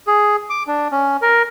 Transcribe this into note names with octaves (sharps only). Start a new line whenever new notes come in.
G#4
D6
D4
C#4
A#4